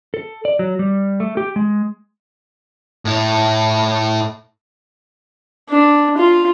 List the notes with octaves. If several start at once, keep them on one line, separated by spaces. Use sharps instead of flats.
A4
D5
F#3
G3
A3
G4
G#3
A2 E4
D4
F4